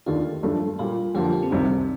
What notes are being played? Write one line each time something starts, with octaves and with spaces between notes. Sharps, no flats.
D#2 D#3 A3 D4 F4 G4
G2 F3 A3 D4
A#2 G3 A#3 F4
F2 D3 F3 A#3 G4
A4
G4
C4
C2 C3 D#3